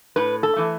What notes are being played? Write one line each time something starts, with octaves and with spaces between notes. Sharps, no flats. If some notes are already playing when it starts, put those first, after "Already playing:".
A2 B4
A4
E3 A3